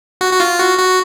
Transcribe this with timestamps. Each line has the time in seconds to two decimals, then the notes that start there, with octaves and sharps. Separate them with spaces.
0.21 F#4
0.33 F#4
0.40 F4
0.59 F#4
0.78 F#4